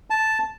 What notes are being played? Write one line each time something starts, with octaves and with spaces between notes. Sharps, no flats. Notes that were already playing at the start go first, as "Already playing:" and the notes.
A5